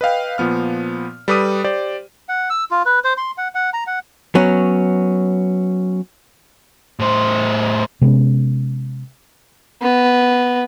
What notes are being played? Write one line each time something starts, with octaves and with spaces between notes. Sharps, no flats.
B4 D#5 F5 G5
A#2 F3 B3 F6
G3 A4 B4 D6 D#6 D#7
G4 C5 D5
F#5
E6
F4
B4
C5
C6
F#5
F#5
A#5
F#5
F#3 B3 C#4
A2 C5
C3 G#3 B3 C#4
B3